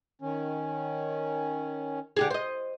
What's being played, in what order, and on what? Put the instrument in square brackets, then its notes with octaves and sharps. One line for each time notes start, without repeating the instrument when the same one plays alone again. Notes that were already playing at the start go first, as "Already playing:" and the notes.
[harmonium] D#3 C#4
[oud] D3 G4 G#4
C5 D#5